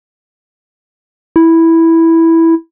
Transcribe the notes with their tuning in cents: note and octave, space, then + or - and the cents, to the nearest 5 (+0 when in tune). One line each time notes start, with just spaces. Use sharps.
E4 -5